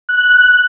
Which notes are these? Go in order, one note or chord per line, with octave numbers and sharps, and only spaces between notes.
F#6